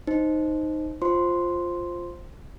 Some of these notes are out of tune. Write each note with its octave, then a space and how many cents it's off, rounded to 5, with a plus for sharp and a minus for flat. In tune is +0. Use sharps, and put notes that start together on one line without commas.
D#4 +0 C5 +0
F4 +0 C5 +5 C6 +0